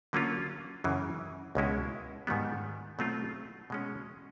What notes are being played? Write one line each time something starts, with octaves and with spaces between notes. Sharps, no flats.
D3 F#3 A#3 C#4 F4
F#2 C#3 E3
C#2 B2 G#3 C#4 E4
G#2 D#3 G3 B3
B2 F#3 A3 C4 F4
B2 G#3 C#4